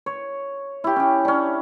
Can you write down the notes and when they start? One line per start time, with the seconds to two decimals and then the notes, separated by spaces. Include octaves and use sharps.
0.06 C#5
0.84 E4 G4
0.96 C#4 G4
1.25 C#4 D4